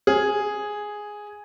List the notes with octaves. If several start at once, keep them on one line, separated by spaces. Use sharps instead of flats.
G#4